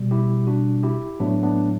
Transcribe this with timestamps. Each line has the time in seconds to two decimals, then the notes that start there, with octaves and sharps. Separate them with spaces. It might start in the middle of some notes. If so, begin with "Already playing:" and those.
Already playing: B2 G3
0.11 E4 G4
0.47 D4 F#4
0.83 E4 G4
1.20 A2 F#3 A3 B3 D4
1.43 B3 D4